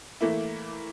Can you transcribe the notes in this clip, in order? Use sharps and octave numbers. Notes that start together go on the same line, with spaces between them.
E3 A3 A#3 E4